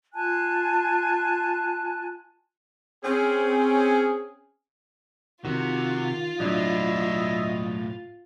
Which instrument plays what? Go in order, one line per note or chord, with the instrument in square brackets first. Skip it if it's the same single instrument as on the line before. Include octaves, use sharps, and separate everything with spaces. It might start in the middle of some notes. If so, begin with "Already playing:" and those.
[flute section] F4 G#5 A5 F#6
[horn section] C4 C#4 G#4
[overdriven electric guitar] C3 [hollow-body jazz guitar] D#3 [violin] F4 [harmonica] F#4
[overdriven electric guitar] B1 A2 [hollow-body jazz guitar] F#3 D4 [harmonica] E4 D#5